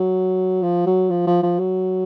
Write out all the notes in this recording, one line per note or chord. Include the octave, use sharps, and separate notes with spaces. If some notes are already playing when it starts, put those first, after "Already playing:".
Already playing: F#3
F3
F#3
F3
F3
F3
F#3